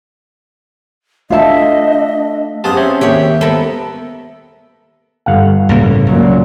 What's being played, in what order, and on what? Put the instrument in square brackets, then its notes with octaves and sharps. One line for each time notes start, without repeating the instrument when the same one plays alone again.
[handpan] A3 E5 [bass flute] D4 [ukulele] F4 A5 [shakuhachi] D#5
[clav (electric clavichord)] F#2 B3 A5 [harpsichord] F4 G#4 C5 [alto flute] G4
[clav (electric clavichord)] C4 C#4 [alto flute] E5
[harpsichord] D#2 [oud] G4 G#4 C#5
[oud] B3 A#4 [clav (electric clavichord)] A4
[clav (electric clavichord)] G1 F5 F#5
[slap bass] C#2 A2 A#3
[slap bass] C#2 [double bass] A#2 F#3